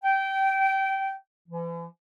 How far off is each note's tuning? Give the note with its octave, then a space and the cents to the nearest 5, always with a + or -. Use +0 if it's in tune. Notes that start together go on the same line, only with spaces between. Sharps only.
G5 -20
E3 +40